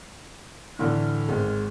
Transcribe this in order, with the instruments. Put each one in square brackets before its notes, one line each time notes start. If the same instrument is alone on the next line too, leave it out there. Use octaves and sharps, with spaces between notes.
[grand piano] A2 D3 E3 [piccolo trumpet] F6
[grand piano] G#1 G#3